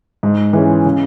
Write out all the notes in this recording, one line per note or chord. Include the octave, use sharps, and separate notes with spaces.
G#2
E3 G#3 C#4
C#3